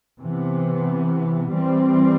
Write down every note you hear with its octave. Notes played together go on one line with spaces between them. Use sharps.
C3 E3 B3
E3 G3 C4